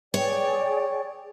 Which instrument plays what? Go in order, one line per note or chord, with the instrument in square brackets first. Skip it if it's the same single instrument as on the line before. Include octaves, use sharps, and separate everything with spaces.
[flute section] G#4 D5 G5 [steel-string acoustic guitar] C#5